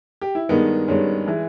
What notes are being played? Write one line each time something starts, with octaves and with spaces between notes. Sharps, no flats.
G4
E4
G2 D#3 G#3 B3 D#4
G2 D#3 G#3 C#4
E3 G#3